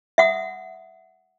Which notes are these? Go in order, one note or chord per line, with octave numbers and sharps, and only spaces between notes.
E5 F#5 D#6